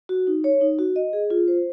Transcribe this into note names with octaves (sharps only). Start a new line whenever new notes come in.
F#4
D#4
C#5
D#4
F#4
D#5
G#4
F4
C5